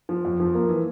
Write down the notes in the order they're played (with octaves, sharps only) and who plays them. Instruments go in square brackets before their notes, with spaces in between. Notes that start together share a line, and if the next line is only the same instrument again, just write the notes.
[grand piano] F3
F2
F3
A#3
E3